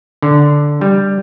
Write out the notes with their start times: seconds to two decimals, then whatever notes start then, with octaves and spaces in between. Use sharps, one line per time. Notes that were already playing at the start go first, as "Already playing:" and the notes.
0.22 D3
0.81 G3